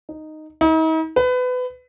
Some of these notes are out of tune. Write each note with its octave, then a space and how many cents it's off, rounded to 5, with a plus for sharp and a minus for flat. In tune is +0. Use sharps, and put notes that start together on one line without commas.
D#4 -5
D#4 +45
B4 +25